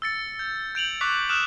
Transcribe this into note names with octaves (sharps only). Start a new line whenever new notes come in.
E6 A6 C#7
G6
G6 D7 F7 F#7
C#6 D6 F#6 B6
D#6 F6 F#6 D7 E7